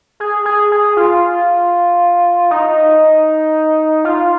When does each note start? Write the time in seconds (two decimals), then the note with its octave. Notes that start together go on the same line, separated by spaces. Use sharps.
0.20 G#4
0.45 G#4
0.72 G#4
0.97 F4
2.51 D#4
4.05 F4